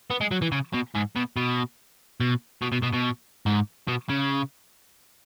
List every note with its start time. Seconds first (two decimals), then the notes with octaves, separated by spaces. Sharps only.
0.11 B3
0.21 G#3
0.31 F#3
0.42 E3
0.52 C#3
0.73 B2
0.95 G#2
1.16 B2
1.37 B2
2.20 B2
2.62 B2
2.72 B2
2.83 B2
2.94 B2
3.46 G#2
3.88 B2
4.09 C#3